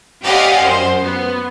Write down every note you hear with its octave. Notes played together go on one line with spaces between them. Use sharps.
G4 D5 D#5 F5 F#5 G#5
F#2 C5
B3